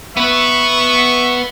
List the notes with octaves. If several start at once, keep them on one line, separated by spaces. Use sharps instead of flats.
B3 B4 E5 C#6